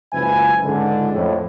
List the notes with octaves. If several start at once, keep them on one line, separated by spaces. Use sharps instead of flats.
F#1 C#2 F3 B4 E5 G#5
C#2 G#2 D3
F2 A2